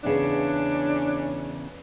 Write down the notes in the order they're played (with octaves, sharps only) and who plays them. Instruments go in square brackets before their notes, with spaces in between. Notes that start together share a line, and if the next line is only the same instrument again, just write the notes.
[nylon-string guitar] E2 C#3 B3 [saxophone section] C#4 D4